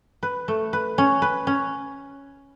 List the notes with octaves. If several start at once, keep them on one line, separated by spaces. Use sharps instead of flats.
B4
A3
B4
C#4
B4
C#4